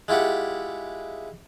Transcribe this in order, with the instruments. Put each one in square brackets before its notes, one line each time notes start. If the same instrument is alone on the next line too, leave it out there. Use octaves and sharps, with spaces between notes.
[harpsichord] G#3 E4 F4 G4 F#5